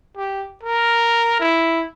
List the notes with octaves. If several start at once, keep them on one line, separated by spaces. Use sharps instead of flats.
G4
A#4
E4